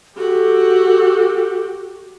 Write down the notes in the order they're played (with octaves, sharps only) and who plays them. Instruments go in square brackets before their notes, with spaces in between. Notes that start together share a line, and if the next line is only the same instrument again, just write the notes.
[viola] F#4 G4 [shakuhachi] A4